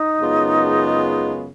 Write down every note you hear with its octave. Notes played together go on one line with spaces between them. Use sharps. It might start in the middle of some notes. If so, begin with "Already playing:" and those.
Already playing: D#4
F#2 C#3 G#3 B3 F4